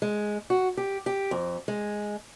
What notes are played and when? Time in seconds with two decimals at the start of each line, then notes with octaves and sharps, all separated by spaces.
0.02 G#3
0.50 F#4
0.77 G4
1.06 G4
1.31 F2
1.68 G#3